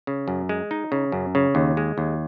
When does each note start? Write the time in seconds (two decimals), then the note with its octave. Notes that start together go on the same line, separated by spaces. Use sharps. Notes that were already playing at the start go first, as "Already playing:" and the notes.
0.07 C#3
0.28 F#2
0.49 G#3
0.71 D#4
0.92 C#3
1.12 F#2
1.35 C#3
1.55 D#2
1.77 G#3
1.98 D#2